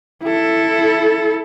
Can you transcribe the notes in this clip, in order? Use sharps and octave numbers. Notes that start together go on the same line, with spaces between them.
E4 A4